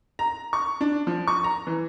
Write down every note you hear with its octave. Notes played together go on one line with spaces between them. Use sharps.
A#5
C#6
D4
F3
C#6
A#5
E3